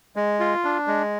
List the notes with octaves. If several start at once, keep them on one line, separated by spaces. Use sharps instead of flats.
G#3
F4
D4
G#3